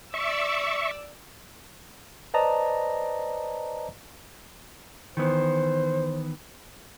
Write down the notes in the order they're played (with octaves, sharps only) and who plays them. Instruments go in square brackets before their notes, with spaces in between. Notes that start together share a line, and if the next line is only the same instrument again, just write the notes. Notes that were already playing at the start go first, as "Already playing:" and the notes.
[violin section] D5 D6 E6 [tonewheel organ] E5 C#6
[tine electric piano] B4 C5 D5 D#5 A5 A#5
[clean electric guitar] D#3 E3 B3 [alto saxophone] C5